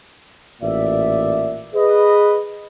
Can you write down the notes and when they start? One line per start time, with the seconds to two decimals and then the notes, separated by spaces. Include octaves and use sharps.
0.62 A1 A#2 D5 E5
1.74 G#4 B4 D#5